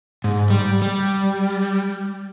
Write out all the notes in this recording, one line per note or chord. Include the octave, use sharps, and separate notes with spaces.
G#2
G3
G3